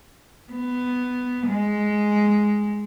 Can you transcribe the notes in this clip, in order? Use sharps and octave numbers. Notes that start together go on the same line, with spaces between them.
B3
G#3